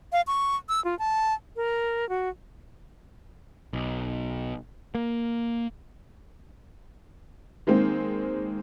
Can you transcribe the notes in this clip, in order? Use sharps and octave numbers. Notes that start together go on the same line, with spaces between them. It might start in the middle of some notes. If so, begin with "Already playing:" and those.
F5
C#6
E6
F4
A5
A#4
F#4
B1
A#3
D#3 G#3 A#3 C4